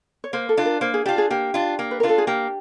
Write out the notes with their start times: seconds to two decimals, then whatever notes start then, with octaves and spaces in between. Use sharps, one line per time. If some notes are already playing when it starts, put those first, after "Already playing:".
0.24 C#5
0.33 A#3 C5
0.49 A4
0.57 D4 F4
0.65 A#4
0.81 A#3 C5
0.94 G#4
1.06 D4 F4 G4
1.18 G#4
1.30 A#3 G4
1.54 D4 F4
1.79 A#3
1.91 B4
2.00 D4 F4 A#4
2.09 A4
2.18 G#4
2.27 A#3 G4